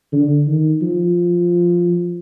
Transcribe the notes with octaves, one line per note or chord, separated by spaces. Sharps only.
D3
D#3
F3